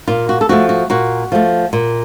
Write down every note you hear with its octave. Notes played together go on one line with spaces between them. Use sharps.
A#2 F4
F#4
A4
F3 A3 F#4
F#4
A#2 F#4
F3 A3
A#2